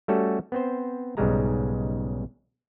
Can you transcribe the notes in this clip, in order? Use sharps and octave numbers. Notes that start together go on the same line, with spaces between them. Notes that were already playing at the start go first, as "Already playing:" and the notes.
G3 A3 C#4 F#4 A4
B3 C4 C5
B1 G#2 C#3 G3 G#3 A#5